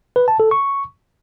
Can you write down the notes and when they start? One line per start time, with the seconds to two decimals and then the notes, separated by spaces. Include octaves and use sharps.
0.16 B4
0.28 A5
0.40 A4
0.51 C#6